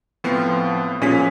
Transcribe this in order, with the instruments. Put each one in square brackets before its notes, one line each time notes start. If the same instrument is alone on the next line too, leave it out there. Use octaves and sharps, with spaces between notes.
[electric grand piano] A2 B3 C4 [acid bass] F3
[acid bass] A#2 [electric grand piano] F3 G#4 B6 [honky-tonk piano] C#4